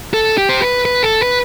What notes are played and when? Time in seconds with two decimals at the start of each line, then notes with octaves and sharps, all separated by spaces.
0.14 A4
0.38 G4
0.49 C5
0.62 B4
0.85 B4
1.03 A4
1.21 B4